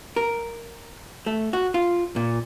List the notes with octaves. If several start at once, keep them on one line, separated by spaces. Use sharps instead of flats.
A#4
A3
F#4
F4
A#2